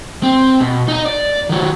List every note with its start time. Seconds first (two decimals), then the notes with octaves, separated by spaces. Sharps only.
0.23 C4
0.61 B2
0.88 D#4 D#5
1.06 D5
1.49 D#3 F#3